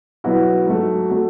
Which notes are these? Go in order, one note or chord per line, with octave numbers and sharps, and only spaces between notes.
B2 F#3 B3 E4 F#4
G#2 F#3 A3
F#3 A3